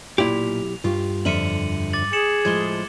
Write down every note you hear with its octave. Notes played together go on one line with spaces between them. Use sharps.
B1 A#2 E4 G4 F7
G2 F4 G4
F2 D3 E5 C#7 D#7 F#7
D6 A6 F#7
G#4 C#7 E7 F#7
A2 F3 G#3 G#6 G7